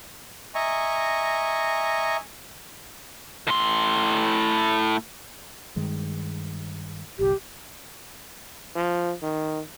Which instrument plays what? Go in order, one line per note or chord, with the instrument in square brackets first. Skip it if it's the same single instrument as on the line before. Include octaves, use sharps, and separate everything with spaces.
[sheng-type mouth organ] D#5 E5 G#5 A#5 C#6
[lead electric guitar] A2 C6
[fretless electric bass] G2 D#3 G#3
[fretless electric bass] G1 C2 [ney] G4
[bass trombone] F3
D#3